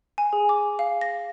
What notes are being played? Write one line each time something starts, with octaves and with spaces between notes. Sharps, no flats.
G#5
G#4
D6
F5
A#6